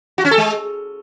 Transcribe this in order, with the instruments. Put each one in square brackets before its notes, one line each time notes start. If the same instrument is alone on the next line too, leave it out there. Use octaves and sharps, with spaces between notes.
[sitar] F#4
C#4
A4
G#3